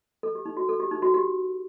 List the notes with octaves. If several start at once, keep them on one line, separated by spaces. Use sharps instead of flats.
A4
G4
D#4
F#4
A4
G4
D#4
F#4
G4